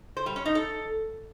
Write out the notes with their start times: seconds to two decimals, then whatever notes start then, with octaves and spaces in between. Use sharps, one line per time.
0.17 C5
0.26 G3
0.36 C#4
0.45 D#4
0.55 A4